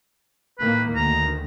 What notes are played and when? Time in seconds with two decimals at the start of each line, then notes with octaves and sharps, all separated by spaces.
0.59 A2 D#3 A#3 B4
0.96 D2 D#3 A#5